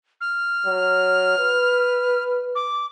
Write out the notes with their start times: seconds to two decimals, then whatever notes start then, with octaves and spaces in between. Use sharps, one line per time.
0.21 F6
0.66 F#3
1.38 B4
2.55 D6